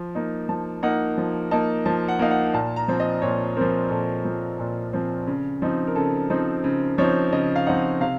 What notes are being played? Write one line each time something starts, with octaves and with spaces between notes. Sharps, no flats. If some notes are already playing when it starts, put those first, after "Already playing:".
Already playing: F3
A#3 D#4
F3 A5
A#3 D#4 F#5
F3
A#3 D#4 A5
F3 A5
F#5
A#3 D#4 F5
F#5
A#2 A5
A#5
F3 C4
D#5
A#2 C#5
F3 C4 A#4
A#2 A4
F3 C4
A#2
F3 C4
C#3
F3 C4 D#4
A#4
C#3 A4
F3 C4 D#4 C5
C#3
F3 C4 D#4 C#5
C#3 D#5
F5
F3 C4 D#4 F#5
C3 F5